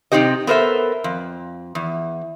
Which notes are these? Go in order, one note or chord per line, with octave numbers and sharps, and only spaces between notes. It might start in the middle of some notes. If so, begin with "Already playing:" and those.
F#2 C3 C4 D#4 G4 D#5
B3 A4 A#4 C5 E5
F2
E2